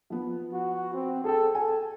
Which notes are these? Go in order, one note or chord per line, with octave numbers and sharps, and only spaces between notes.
F3 B3
F#4
C4
G#4 A4 G5
A4 G#5